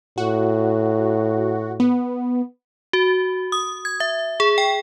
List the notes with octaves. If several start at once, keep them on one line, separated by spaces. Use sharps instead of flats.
A2 F#4
B3
F#4
D#6
G#6
E5
G#4
G5